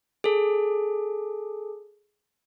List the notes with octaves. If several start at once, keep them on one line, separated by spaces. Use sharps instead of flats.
G#4 A4